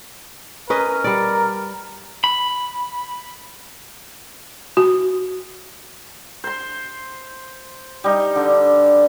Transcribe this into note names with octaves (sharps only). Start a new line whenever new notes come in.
C#4 A#4 B4 D#5
G3 D5
B5
F#4
C5 C6
G3 D#4
D3